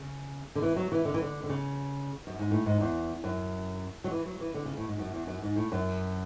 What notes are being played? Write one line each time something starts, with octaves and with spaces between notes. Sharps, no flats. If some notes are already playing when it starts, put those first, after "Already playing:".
Already playing: C#3
D3
E3
F#3
E3
D3
E3
D3
D3
C#3
F#2
G#2
A2
G#2
E2
F#2
F#3
E3
F#3
E3
D3
C#3
A2
G#2
F#2
E2
F#2
G#2
A2
F#2